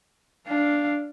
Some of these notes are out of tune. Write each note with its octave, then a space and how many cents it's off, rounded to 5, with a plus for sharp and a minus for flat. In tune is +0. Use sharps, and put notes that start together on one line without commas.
D4 -5 F5 -10